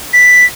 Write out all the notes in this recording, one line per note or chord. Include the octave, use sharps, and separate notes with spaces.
B6